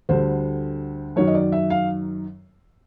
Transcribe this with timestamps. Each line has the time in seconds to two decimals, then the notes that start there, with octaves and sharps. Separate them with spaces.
0.09 D2 D3 G3 C5
1.16 F#2 D#3 F#3 C#5
1.27 D#5
1.34 D5
1.52 E5
1.70 F5